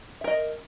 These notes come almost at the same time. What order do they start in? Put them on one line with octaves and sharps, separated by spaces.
E5 A#4 D#5